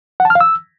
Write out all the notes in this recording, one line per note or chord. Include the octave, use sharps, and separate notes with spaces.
F#5
A5
F6
F5
E6